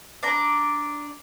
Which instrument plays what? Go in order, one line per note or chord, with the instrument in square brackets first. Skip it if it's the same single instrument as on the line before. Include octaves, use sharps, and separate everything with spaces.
[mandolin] D4 D5 A#5